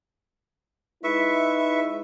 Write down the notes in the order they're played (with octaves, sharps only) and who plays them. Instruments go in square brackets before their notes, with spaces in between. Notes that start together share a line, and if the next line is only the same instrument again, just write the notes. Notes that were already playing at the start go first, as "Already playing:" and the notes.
[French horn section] G#3 D#4 E4 [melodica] B4 E5 C#6